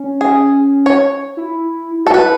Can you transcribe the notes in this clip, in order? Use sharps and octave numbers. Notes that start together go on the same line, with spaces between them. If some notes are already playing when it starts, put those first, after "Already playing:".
Already playing: C#4
G#4
C#5
E4
F#4 A4
E4 B4